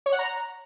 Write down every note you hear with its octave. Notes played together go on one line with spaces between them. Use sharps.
C#5
F#5
A#5